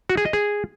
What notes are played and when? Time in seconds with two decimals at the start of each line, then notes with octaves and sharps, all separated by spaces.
0.10 F#4
0.17 G#4
0.25 D#5
0.33 G#4